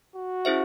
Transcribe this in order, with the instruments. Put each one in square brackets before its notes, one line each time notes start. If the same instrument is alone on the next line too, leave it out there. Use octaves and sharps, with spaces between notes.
[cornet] F#4
[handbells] C#4 E4 G#4 C5 E5